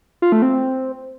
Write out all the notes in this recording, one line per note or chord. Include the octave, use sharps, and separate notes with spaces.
F4
A3
C4